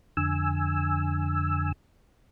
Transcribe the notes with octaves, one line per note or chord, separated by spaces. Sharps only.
F2 D3 G#5 E6